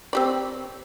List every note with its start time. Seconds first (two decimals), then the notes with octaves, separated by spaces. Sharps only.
0.13 C4 G4 D5